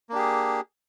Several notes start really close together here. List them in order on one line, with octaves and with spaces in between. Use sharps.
A#3 D4 G4 G#4